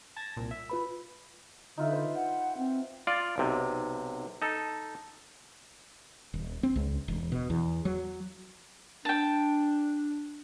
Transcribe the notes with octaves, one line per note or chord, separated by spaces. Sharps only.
A5 G#6 A#6
C2 A#2
E5
F4 B4 B5
D3 D#4 F4 E5
B4 C5
F#5
C4
F4 D5
B1 C3
D#4 A4
D#1
C4
C#2
E1
B2
E2
F#3
D4 G5 A5